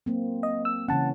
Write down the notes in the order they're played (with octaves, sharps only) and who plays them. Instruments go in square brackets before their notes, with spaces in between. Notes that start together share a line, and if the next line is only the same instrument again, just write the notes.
[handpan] F#3 A#3 C4
[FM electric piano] D#5
E6
[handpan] C#3 E3 C#4 [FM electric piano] F#5 A5